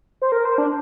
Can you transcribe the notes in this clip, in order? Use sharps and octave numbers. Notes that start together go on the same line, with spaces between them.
C5
A#4
C5
D4